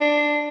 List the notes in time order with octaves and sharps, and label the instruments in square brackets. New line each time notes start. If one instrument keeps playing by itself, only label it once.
[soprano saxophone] D4